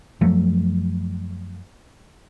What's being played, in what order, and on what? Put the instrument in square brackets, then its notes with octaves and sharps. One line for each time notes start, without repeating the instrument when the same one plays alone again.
[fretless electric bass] F#2 F3 F#3 A3